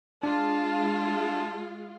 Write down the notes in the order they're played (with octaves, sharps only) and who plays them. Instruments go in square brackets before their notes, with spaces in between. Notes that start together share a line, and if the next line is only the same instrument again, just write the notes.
[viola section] G#3 F4 [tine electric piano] D4 [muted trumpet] A5